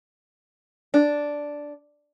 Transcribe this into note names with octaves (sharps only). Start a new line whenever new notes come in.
D4